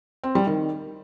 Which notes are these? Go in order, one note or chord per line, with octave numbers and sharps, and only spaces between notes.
C4
G3
D#3